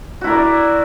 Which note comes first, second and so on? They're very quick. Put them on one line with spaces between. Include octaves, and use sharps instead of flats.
F#4 E4 A#4 D5